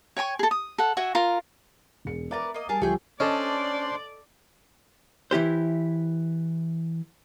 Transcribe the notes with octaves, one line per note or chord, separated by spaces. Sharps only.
C#5 G5 G#5 C#6
G#4 A4
D#6
A4 F#5
F#4 E5 G#5
F4 A#4
E1 G#4 C#7
A#4 B4 D5 E5 A#5 A6
A#3 D#5
G3 G#4 A#4 A5
C#2 F3 G3 A3 G4 G#4 G5
C#4 D4 A4 C5 D5 D#5 C6
E3 E4 G4 C5